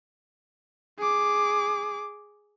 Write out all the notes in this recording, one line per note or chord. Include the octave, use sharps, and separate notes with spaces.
G#4 D6